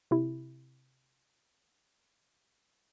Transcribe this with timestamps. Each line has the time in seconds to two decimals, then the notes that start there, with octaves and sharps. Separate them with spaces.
0.11 C3 E4